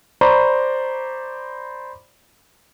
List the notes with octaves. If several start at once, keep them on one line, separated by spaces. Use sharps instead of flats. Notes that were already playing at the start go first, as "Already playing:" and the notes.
C5 D5 A#5 B5 C#6 D6